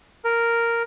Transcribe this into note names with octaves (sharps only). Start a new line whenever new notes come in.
A#4